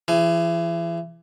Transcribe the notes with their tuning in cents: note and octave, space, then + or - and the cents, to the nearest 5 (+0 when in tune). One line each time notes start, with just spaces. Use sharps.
E3 +35 G#4 +0